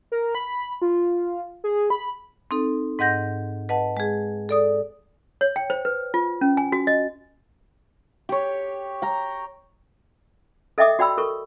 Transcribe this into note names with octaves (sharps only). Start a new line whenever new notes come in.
A#4
B5
F4
G#4
B5
C4 D#4 A4
G#2 D#5 F#5 G6 A#6
B4 D#5 F#5 A5
G#3 G#4
A4 D5 D#6
C#5
G5
C5
B4
F4
C#4
G#5
F#4
D#5
G4 C#5
G5 A#5
A4 D#5 E5 G5 D6 D#6
F#4 D5 G5 B5 E6
A4 A#4 C#6